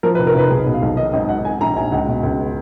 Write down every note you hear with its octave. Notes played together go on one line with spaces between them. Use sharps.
F3 A#4
B4
F1
A#4
F1 B4
B1 G#4
B2
F5
B1
D#3 D#5
G#1 D#5
G#1 F#5
D#3 G#5
A#1 A#5
A#1 G#5
C#2 F#5
B2
C#2